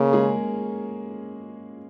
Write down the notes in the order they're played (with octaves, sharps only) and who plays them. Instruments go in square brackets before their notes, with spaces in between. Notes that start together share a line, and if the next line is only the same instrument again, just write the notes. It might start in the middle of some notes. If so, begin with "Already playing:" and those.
Already playing: [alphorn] C#3 [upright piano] A#3 C#4 A#4
[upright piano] G#3 G#4